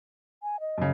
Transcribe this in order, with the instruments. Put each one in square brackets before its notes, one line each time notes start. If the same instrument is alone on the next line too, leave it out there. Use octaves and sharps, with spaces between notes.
[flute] G#5
D#5
[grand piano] F#2 C#3